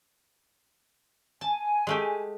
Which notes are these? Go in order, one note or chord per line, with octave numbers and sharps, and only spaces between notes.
G#5 A5
G#3 A3 G4